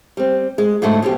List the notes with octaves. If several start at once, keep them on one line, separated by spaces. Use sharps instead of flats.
G3 C4
G#3
G#2 D3 F#3 A3 F#5
F2 B2 C#4 G4